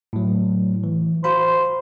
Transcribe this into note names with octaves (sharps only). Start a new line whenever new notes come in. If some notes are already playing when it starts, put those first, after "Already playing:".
A2 F#3
E3
F#4 C5 F5 B5